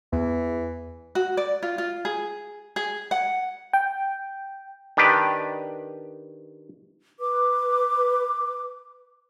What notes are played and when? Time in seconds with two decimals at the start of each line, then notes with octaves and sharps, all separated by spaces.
0.13 E2 E3
1.15 F#4
1.37 D5
1.63 F4
1.78 F4
2.05 G#4
2.76 G#4
3.11 F#5
3.73 G5
4.97 D#3 D4 G4 B4
7.20 B4 D6